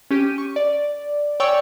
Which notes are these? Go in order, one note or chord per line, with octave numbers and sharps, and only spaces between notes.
C#4 G4 D#7
C#6
D5
C#5 D5 G5 G#5 C#6 E6